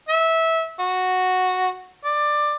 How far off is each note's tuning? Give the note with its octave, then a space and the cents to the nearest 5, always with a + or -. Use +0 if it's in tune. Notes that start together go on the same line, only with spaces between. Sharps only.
E5 -20
F#4 -5
D5 +15